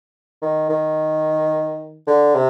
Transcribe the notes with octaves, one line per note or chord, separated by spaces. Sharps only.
D#3
D#3
D3
C3